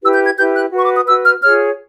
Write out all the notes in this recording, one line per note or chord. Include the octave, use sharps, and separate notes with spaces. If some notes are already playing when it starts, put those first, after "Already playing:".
E4 G4 B4 E6
G6
G#6
E4 G4 B4 G6
F#6
F#4 B4
C#6
D6
D#6
F#4 B4 E6
F6
F4 G#4 C#5 F6